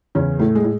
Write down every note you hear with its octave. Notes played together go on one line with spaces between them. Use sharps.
E2 C#3 C#4
A2 A3
G#3
A2